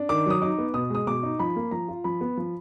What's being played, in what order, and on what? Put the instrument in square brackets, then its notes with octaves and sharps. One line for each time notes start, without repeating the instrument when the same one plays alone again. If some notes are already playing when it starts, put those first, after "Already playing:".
Already playing: [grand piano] D4
D#3 D6
F#3 D#6
D#4 D6
B3
B2 D#6
G#3 D#6
B2 D6
D#4
F3 B5
A#3
F3 A#5
F4
F3 B5
B3
F3